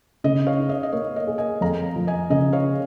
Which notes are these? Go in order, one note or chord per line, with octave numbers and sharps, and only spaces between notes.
C#3 D#5
C#5 F5
D#4
D#5
D#5
A#3 C#5
D#5
G#4
D#5 G#5
F2 F5 A#5
F3
D#5 G#5
C#3 D#5
C#5 F5